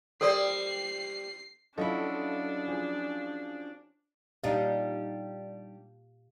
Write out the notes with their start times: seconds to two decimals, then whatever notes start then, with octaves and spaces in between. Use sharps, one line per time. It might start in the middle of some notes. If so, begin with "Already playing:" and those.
0.21 G3 A4 A#4 C5 D5 C7
1.78 F#3 C#4 D4 E4 F4 A4 D#5
2.68 F3 G#4
4.44 A#2 G3 D4 D#4 G4 F5